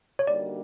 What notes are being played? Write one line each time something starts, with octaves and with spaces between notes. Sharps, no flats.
C#5
D3 G3 A#3 D#4 F#4 D5